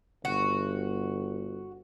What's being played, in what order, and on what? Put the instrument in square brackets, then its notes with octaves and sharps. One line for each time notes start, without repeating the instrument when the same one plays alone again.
[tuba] G1 [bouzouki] F#4